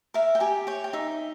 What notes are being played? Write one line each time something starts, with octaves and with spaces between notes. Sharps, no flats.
A#4 E5
G5
G4 G#5
C#5 G5
G5
D#4 E5